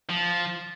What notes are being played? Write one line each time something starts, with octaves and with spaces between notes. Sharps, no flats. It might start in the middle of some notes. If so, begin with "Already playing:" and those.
F3